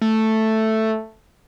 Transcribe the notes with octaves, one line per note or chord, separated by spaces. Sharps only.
A3